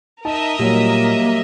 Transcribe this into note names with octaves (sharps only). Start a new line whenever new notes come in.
D#4 A#4 D#5 E5 A5
A#2 F#3 G3 A#3